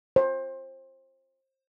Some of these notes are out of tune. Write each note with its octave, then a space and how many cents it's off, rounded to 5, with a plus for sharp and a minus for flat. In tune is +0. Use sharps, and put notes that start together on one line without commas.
C5 +25